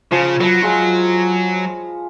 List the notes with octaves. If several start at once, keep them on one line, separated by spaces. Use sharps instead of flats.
C#3 F3
F#3 B4 A5
G#3 F4